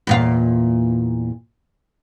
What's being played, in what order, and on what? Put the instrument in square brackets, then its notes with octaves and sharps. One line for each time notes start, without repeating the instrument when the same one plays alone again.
[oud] E2 A#2 F5